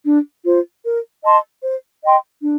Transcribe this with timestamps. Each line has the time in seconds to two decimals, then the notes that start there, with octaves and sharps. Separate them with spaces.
0.05 D4
0.44 F4 C5
0.84 A#4
1.24 D#5 A5 C6
1.63 C5
2.02 D#5 G5 C6
2.43 D4